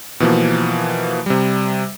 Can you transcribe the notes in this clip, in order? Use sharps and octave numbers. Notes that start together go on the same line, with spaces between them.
B2 E3 F3 A#3
C3 G3